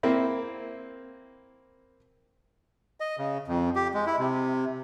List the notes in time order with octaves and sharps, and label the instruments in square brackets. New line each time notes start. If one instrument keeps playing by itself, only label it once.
[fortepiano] A#3 C4 E4
[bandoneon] D#5
C#3
F2
G4
G#3
E4
C3